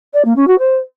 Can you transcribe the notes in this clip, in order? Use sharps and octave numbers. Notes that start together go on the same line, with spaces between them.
D5
A#3
C#4
F#4
C5